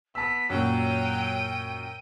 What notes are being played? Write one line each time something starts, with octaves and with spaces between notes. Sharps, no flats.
B3 A5 E6 B6
F#2 A#2 F#3 G5 E6 D#7